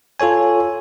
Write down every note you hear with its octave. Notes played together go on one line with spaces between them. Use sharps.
F4 A4 C#5 G#5